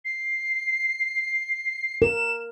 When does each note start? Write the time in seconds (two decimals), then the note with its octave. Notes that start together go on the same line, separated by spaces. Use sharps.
0.05 C7
2.02 A#4 E7